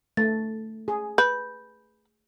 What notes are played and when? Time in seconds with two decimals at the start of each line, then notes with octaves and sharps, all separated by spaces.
0.17 A3 A6
0.88 G#4
1.18 B4 G6